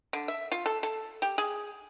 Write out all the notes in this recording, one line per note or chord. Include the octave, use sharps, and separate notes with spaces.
D3
E5
F4
A4
A4
G4
G#4